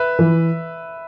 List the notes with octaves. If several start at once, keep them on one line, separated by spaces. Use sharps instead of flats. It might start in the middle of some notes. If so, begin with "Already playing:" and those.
Already playing: B4 E5
E3